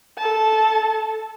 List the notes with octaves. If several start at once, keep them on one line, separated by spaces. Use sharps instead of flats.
A4 A5